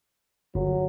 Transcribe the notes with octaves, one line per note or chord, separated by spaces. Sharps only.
G1 F#3